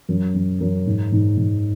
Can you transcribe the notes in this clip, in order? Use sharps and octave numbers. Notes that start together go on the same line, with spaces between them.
F#2
F#2
F#2
G#2
G#2
G#2